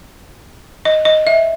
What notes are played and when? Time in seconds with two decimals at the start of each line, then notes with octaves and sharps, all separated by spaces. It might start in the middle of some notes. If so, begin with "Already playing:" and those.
0.85 D#5
1.05 D#5
1.27 E5